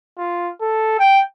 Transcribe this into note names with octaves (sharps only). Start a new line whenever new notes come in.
F4
A4
G5